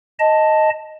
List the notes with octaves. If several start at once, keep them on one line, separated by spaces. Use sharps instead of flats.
D#5 A5